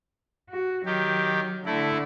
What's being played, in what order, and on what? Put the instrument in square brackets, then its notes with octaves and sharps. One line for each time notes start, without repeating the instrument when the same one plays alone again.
[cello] F#4
[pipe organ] D#3 G4 [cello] F#3
[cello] D3 [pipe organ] A3 E4